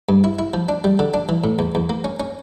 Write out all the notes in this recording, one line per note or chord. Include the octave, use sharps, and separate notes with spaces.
G2
E4
E4
F3
D4
G3
D3
D4
E3
A2
E2
E2
A#3
C#4
C#4